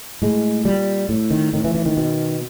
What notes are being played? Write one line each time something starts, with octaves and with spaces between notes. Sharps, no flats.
A2 G#3
A#2 G3
A2
D#3
A2 D#3
E3
E3
D#3
B2